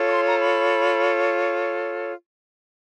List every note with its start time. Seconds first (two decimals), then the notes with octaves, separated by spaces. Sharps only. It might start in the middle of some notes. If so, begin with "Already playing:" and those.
Already playing: F4 A4 C#5
0.08 C#6
0.13 C6
0.28 A#5
0.40 B5